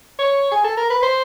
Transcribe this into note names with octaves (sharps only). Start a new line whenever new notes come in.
C#5
G#4
A4
A#4
B4
C5